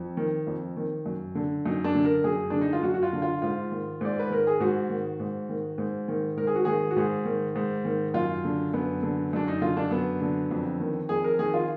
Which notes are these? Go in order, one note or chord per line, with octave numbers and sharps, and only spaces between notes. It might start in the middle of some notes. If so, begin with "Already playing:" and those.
Already playing: F2
D#3
F2
D#3
F#2
D3
F#2 D#4
D4
D3
A#4
F#2 G#4
D3 D4
D#4
F4
F#2 F#4
F#4
F4
D3
F4
G#2 F4
D#3
G#2 D5
B4
D#3 A#4
G#4
G#2 F#4
D#3
G#2
D#3
G#2
D#3
G#2 A#4
G#4
F#4
D#3 G#4
F#4
G#2 G#4
D#3
G#2
D#3
F#2 F4
D3
F#2 B3
D3
F#2 D4
D#4
D3 F4
D4
F#2 B3
D3
F2
D#3
F2 G#4
A#4
D#3 G#4
F4